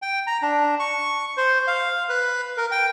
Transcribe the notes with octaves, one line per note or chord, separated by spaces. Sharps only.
G5
A#5
D4
C#6
C5
F5
B4
A#4
G5